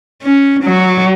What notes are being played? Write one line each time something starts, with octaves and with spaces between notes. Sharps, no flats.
C#4
F#3